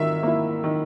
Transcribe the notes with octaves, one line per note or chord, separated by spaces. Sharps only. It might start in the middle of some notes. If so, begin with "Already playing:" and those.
Already playing: D#3 A#3 E5
A#3 E4
D#3